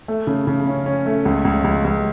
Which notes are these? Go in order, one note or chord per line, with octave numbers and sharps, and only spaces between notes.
A3
C#3
C#3
C#4
C#4
A3
C#2
C#2
C#2
C#2